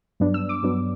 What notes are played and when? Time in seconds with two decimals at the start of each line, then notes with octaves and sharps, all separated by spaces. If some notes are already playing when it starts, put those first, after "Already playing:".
0.20 G2 F#3 B3 D4
0.34 E6
0.49 D6
0.63 G2 F#3 B3 D4